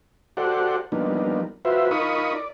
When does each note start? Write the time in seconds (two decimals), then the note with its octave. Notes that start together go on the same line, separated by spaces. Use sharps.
0.37 F#4 G4 A4 C5 D5 F#5
0.92 F3 G3 A#3 B3 D4 D#4
1.65 F4 F#4 B4 C5 E5
1.91 D#4 F4 A#4 B5 C#6 D#6
2.35 D5